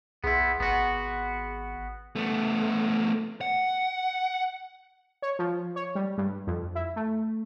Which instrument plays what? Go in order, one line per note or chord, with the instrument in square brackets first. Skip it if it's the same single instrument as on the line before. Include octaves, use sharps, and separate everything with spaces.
[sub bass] B1 [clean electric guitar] B3 E4 [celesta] G#4 C6
[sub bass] G#1 [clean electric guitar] B3 F#4
[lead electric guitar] A3 B3
F#5
[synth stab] C#5
F3
C#5
G3
G2
F2
E4
A3